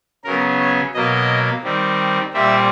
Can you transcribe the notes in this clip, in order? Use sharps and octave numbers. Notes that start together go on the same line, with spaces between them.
C#3 F#3 B3 A#4
C#5
B2 F#3 A#3 D#5
D#3 G3 C4
A#2 G3 C4 E5